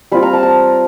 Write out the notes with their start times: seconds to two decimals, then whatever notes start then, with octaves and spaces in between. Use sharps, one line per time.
0.11 G3 C4 F4 B5
0.23 A#5
0.33 A5
0.43 A#5